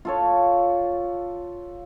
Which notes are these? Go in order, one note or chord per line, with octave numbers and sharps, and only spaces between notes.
F4 A4 C#5